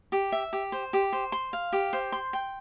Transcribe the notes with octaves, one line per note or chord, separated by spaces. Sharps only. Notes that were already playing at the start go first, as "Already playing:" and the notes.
G4
E5
G4
C5
G4
C5
C6
F5
G4
C5
C6
G5